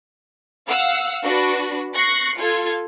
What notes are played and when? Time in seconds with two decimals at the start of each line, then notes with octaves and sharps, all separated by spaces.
0.67 F5 F#5 E6
1.23 D4 F#4 B4
1.94 C#6 F#6 A#6 C7 C#7
2.36 F4 A4 G#6